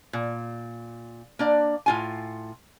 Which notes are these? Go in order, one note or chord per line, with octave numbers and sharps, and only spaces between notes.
A#2
A#3 D4 D5
A2 F4 G#5